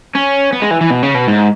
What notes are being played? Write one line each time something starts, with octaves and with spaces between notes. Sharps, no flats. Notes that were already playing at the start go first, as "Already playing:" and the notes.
C#4
B3
G#3
E3
E3
B2
C#3
B2
G#2